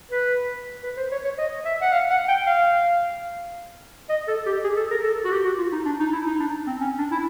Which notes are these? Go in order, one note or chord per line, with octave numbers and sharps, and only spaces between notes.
B4
B4
C5
C#5
C#5
D#5
E5
F#5
F5
F#5
G5
F5
D#5
A4
G4
G#4
A4
A#4
A4
F#4
G4
F#4
F4
D#4
D4
D#4
E4
D#4
D4
C4
C#4
D4
E4